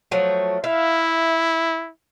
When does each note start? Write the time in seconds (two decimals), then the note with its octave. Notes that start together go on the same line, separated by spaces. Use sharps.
0.11 F3 F#3 A3
0.64 E4 E5 F5